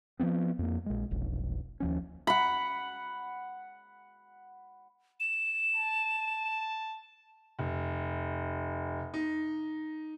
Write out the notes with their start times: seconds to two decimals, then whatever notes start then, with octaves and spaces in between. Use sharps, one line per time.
0.19 F3 G3 B3 C4
0.59 F2 A#3
0.86 A#1 G#3
1.11 F1 B1
1.80 D#2 F3 C#4
2.27 F#5 B5
5.20 E7
5.75 A5
7.59 F1
9.14 D#4